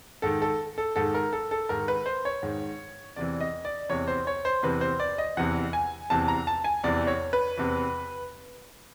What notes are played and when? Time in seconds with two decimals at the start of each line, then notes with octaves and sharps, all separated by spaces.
0.22 G#2 D#3 A4
0.42 A4
0.78 A4
0.96 G#2 D#3 A4
1.14 A#4
1.33 A4
1.51 A4
1.69 G#2 D#3 A#4
1.88 B4
2.06 C5
2.25 C#5
2.43 G#2 D#3
3.16 E2 C3 E3 D5
3.41 D#5
3.65 D5
3.89 E2 C3 E3 C#5
4.08 C5
4.27 C#5
4.45 C5
4.63 E2 C3 E3 B4
4.81 C5
5.00 D5
5.18 D#5
5.37 E2 C3 E3 F#5
5.73 G#5
6.10 E2 C3 E3 A5
6.28 A#5
6.47 A5
6.64 G#5
6.84 E2 C3 E3 D5
7.07 C#5
7.33 B4
7.57 E2 C3 E3